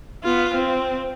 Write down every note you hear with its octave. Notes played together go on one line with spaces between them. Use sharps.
B3 F4
C4